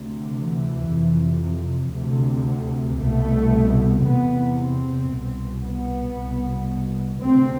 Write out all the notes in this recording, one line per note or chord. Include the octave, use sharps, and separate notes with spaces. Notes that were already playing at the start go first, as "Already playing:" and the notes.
Already playing: D2 C3
E3
F2 C3
D2 C3
C2 B2 A3
E2 C3 B3
C4
C2 B2
B3
C2 B2
D2 C3 C4